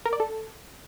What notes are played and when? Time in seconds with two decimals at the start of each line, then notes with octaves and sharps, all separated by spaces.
0.05 A#4
0.13 D5
0.20 A4